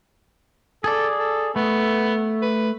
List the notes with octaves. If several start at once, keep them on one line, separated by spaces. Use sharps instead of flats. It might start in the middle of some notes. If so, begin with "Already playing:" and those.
G#4 A4 D5
A4
A3 B3
B4